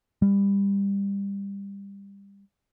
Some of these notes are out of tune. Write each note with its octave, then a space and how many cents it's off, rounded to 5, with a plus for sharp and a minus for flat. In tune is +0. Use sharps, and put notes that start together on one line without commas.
G3 +20